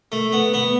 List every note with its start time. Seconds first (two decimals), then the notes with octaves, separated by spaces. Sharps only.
0.12 A3
0.32 B3
0.54 B3